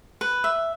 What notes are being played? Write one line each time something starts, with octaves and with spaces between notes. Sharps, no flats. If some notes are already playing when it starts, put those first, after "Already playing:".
B4
E5